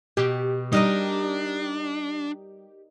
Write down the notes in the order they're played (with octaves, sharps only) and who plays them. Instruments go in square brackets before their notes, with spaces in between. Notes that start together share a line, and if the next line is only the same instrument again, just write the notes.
[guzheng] B2 [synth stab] G4
[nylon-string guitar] G3 [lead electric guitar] D4 [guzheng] D#4 A#4 D#5